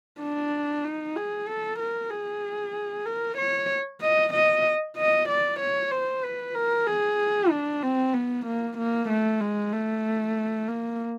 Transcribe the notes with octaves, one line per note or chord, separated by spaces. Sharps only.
D4
D#4
G#4
A4
A#4
G#4
A#4
C#5
D#5
D#5
D#5
D5
C#5
C5
B4
A#4
G#4
D4
C4
B3
A#3
A#3
A3
G#3
A3
A#3